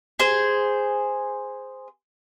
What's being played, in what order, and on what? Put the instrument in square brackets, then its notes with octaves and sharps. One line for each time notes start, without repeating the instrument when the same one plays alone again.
[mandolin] G#4 C5